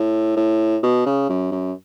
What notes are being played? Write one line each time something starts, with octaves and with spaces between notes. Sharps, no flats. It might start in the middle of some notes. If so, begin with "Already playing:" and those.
Already playing: A2
A2
B2
C#3
F#2
F#2